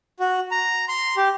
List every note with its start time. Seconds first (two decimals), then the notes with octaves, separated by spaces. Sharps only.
0.20 F#4
0.51 A#5
0.88 C6
1.17 G4